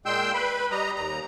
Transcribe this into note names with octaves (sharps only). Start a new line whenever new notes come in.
A#2 G#3 G5 C6 E6 G6
B4 B5
G3 D#5 A#5
D#2 A#5